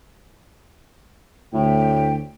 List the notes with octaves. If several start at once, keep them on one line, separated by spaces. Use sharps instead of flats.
D2 A2 G5